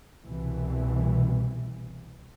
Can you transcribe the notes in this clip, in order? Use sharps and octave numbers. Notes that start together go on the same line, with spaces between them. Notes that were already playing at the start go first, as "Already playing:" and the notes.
C2 B2 E3